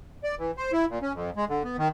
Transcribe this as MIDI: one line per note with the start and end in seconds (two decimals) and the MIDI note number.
0.23 0.35 74
0.39 0.51 52
0.57 0.72 72
0.72 0.86 64
0.89 0.99 46
1.02 1.13 61
1.13 1.30 41
1.36 1.45 56
1.49 1.63 50
1.64 1.77 59
1.78 1.88 51